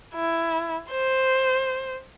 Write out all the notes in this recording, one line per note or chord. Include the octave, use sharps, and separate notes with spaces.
E4
C5